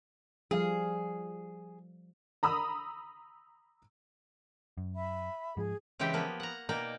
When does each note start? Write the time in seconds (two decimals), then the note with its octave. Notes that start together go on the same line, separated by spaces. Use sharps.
0.51 F3 G3 G#4 F5
2.43 A#5 B5 D#6 E6
4.78 F#2
4.95 E5 B5
5.57 G#2 F3 G#4
5.99 C#3 E3 G#3 C4 G4 G5
6.13 F3 A#3 B3
6.40 F#5 A#5
6.69 B2 A#3 D#4 D5 G5